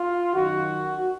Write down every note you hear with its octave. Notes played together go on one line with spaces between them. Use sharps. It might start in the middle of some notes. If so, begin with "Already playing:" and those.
Already playing: F4
F#2 D#3 F#4